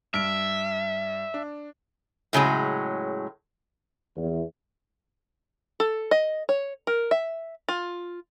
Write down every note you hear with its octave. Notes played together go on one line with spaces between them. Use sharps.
G2 E5 F6 D7
D4
A2 C#3 F#3 G#3
E2
A4
D#5
C#5
A#4
E5
F4